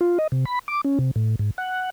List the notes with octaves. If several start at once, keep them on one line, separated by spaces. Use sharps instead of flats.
F4
D#5
C3
B5
D6
C#4
C3
A2
G#2
F#5